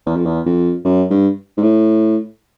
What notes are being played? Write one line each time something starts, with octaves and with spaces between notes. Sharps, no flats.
E2
F2
E2
F2
F#2
G2
G#2
A2